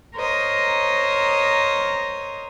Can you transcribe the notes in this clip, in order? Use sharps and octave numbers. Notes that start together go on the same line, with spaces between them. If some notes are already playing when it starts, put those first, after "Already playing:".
A#4 C5 C#5 D#5